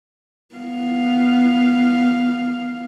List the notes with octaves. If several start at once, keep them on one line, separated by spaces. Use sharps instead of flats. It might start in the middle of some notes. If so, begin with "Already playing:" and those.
B3 F5